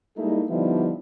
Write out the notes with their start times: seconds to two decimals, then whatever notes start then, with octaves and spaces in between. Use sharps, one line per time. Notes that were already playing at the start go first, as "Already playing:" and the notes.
0.17 G3 G#3 A#3 D#4 E4 A4
0.49 D3 F3 G3 B3 D#4 E4